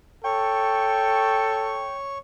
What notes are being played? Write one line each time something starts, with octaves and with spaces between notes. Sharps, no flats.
A4 C#5 G5 C#6